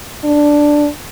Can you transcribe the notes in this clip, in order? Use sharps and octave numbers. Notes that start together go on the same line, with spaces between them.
D4